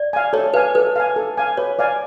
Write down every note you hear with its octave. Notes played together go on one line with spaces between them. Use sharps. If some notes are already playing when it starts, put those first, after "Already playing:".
Already playing: D5
F5 G#5
A4 C#5
B4 F5 G#5
A4 B4
F5 G#5
A4
F5 G#5
B4 C#5
D5 F5 G#5